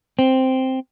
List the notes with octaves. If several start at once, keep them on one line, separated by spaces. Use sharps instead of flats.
C4